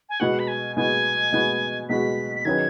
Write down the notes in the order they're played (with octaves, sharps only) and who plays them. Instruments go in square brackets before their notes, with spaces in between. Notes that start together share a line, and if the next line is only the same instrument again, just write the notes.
[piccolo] G#5
[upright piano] B2 G#3 B3 F#4 [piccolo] F#5
[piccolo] B5
G#5
[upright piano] B2 G#3 B3 F#4 [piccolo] G#5
[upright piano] B2 G#3 B3 F#4
[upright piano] B2 G#3 B3 F#4 [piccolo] B6
[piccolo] B6
[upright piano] D#3 F#3 C#4 G#4 B4 [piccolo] G#6